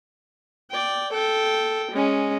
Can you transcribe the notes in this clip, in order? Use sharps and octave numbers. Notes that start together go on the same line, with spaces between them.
D5 G5
A4 G5
G#3 C#4